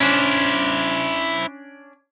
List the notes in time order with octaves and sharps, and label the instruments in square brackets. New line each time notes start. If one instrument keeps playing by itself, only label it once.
[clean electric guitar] C#4 D4 [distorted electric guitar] E4 C5